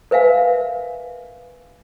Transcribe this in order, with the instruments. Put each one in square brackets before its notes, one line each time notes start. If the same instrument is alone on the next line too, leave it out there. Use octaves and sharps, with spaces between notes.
[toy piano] A#4 B4 E5 F5 G#5